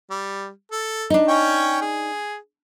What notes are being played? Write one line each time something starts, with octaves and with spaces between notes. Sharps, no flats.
G3
A4
D4 D#4
C#4 C#5 G5
G#4